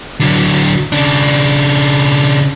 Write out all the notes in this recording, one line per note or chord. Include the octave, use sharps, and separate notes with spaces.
D3 F#3
C#3 D4